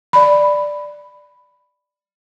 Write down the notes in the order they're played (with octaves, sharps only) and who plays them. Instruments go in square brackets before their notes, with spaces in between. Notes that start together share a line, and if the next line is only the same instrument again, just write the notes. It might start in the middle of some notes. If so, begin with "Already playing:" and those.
[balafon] D5 B5